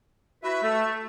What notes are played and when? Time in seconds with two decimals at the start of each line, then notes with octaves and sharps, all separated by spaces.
0.43 E4 F#4 B4 E5
0.62 A3